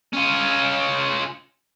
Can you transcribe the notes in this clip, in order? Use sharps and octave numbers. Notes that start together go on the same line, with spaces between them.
C#4 F4